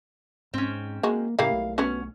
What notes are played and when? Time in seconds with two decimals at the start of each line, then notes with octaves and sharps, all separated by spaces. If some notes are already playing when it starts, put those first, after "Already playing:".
0.54 G#2 C4 C#4
1.03 G#3 A#3 F#4
1.39 A2 C#3 G3 A#3 E4 F5
1.50 B1 A3
1.78 B3 C#4 F#4